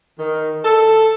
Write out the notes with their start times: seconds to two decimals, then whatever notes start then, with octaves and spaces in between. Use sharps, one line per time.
0.19 D#3
0.65 A4